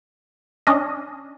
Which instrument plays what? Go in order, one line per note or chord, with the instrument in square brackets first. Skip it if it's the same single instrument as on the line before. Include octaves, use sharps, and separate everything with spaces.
[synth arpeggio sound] C#4 D4 D#5